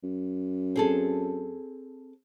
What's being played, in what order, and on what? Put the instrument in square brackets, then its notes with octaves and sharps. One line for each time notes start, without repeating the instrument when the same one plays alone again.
[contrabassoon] F#2
[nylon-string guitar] C4 G#4 A4